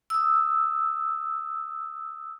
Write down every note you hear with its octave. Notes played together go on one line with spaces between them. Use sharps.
D#6 E6